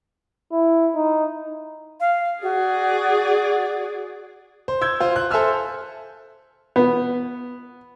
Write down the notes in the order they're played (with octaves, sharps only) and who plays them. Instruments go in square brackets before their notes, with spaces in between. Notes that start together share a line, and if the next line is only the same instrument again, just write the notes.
[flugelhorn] E4
D#4
[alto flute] F5
[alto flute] F#4 [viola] G#4 D5
[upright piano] C5
E6 G6 G#6
F4 C5
F#6
A4 C5 E5 G#5 E6 F6
[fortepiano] B3